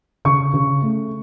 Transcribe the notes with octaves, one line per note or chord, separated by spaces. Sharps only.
C#3 C#6
C#3
A3